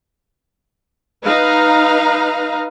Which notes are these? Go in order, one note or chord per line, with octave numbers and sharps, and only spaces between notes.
D#4 B4 F5 A#5